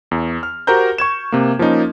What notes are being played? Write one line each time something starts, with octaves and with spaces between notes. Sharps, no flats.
E2
F6
F#4 G4 A#4 C5 A#5 G6
C#6 G#6 E7
C3 A#3
F3 A#3 C#4 D#4